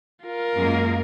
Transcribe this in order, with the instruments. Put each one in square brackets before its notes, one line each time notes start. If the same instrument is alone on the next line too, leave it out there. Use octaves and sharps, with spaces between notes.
[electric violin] F4 A#4
[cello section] F#2 G#3 A#3